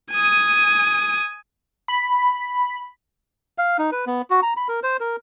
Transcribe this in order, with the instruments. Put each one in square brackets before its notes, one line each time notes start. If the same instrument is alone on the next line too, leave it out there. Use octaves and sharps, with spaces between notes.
[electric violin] G#5 D#6
[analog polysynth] B5
[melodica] F5
D#4
B4
B3
F#4
A#5
B5
A#4
C5
A#4